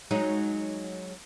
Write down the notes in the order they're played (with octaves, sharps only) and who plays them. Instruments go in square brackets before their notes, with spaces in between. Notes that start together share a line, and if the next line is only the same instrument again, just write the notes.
[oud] F#3 G#3 D#4